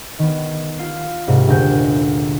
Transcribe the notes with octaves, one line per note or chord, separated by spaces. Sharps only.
D#3 B3
F4 C7
C2 G#2 C3
F#1 D2 A#2 G#4 A#4 G6